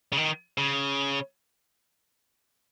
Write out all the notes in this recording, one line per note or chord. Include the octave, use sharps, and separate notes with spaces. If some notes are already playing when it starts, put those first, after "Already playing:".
C#3
D#3
C#3